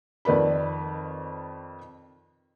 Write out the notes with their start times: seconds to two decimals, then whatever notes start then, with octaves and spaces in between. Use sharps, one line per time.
0.25 F2 D#3 B4 D5 B5